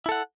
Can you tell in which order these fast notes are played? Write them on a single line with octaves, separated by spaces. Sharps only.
E4 A4 F#5